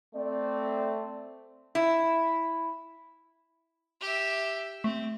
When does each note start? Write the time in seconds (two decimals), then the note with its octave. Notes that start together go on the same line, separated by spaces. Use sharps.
0.16 A3 C4 D5
1.75 E4
4.01 G4 E5
4.84 A3 C4